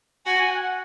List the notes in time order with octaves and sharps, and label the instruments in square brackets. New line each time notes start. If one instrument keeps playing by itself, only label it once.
[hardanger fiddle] F#4 [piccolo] G#5
[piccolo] G#5
F#5